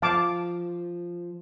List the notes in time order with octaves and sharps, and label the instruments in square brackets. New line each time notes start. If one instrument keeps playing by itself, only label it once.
[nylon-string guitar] F3 [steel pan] F5 A5 D6